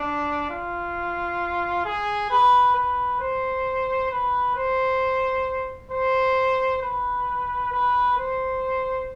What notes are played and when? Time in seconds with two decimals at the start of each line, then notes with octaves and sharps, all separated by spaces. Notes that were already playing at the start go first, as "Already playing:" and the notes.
Already playing: D4
0.50 F4
1.85 G#4
2.30 B4
2.75 B4
3.20 C5
4.11 B4
4.56 C5
5.91 C5
6.82 B4
7.72 B4
8.18 C5